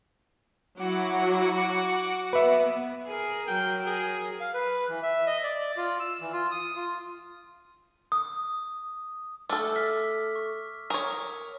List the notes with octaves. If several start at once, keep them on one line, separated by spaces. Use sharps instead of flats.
F#3 E4 F#4 F#5 D6
B3 B4 E5
G#4 A#4
F#3 A#4 G5
G#4
F5
B4
E3
E5
D#5
D5
F4
E6
E3
F4
D#6
F4
D#6
A3 A4 D6 E6 F6
F6 B6
C#6
A#4 C#5 C#6 D#6